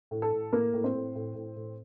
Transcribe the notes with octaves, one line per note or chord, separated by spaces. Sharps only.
A2
A4
A2
A2 A#3 A#4
A2
C4 C5
A2
A2
A2
A2